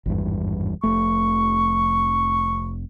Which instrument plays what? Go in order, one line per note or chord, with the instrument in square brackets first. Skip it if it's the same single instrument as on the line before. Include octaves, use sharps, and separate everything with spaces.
[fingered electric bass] G#1 E2 G2
[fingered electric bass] F1 A3 [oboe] C#6